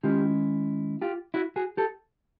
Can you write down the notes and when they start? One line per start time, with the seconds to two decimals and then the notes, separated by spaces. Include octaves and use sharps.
0.03 D#3 G#3 C#4 E4 F4 G4
1.02 F4 G4
1.34 E4 F#4
1.56 F#4 G#4
1.77 G4 A4